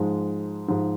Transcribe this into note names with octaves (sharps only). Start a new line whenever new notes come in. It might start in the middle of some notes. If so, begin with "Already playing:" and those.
Already playing: G#2 F3 G#3
G#2 F3 G#3